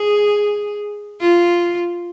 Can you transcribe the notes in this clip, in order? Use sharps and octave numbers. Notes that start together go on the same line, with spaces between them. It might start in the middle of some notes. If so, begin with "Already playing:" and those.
Already playing: G#4
F4